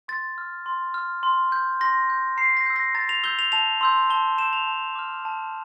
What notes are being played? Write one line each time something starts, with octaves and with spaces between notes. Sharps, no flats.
C6 A6
F6
C6
F6
C6
G6
C6 A#6
G6
A#5 C7
A#6
E6 G6
A#6
A#5 A6
F7
E6 G6 G7
F7
A5 F7
C6 E6 G6
A5 G7
C6 E6 G6 E7
F7
A5
D6 F6
A5